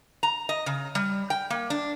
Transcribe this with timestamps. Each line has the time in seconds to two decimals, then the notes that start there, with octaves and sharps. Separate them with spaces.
0.23 A#5
0.49 D#5
0.66 C#3
0.95 G3
1.30 G5
1.50 A#3
1.70 D4